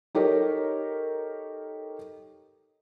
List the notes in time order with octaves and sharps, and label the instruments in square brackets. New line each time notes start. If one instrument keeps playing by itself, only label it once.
[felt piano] D#4 G4 A4 A#4 C#5